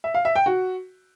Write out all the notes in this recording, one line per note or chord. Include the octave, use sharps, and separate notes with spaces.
E5
F5
E5
G5
F#4